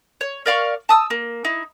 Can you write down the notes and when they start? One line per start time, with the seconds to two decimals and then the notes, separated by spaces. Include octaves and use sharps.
0.21 C#5
0.46 A#4 D5 F5 C#6
0.89 A5 D#6 E6
1.10 A#3
1.45 D#4 E4